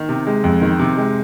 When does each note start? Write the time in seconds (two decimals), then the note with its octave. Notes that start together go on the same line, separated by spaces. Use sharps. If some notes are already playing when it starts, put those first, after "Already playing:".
Already playing: D#3
0.09 C3
0.27 G#3
0.44 F2
0.62 D#3
0.79 C3
0.97 G#3